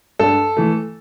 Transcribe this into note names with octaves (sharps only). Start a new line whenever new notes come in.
G2 A4
E3 A3